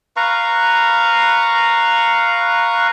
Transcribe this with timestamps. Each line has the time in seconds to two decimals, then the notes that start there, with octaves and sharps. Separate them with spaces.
0.17 B4 F5 A#5 C#6